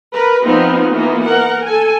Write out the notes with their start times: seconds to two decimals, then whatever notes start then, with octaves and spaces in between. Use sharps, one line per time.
0.14 A#4 B4
0.45 F3 B3 C4 D#4 F4
0.93 E3 A#3 B3 D#4 F4
1.23 A#4 F#5
1.65 A4 G#5